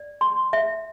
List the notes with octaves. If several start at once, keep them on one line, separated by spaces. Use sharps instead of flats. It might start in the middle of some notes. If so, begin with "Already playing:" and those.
Already playing: D5
C6
E5